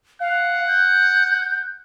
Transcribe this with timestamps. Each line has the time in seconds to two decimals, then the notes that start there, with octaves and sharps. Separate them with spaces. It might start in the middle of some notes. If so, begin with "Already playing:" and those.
0.20 F5 F#5
0.68 G6